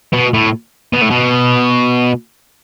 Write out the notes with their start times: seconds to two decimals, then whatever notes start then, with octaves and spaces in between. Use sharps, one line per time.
0.13 B2
0.34 A2
0.93 B2
1.02 A2
1.11 B2